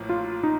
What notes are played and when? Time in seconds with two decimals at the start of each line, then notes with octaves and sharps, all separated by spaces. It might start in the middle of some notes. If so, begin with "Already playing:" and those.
Already playing: A1 A2 F3 A#3
0.09 F4
0.43 D#4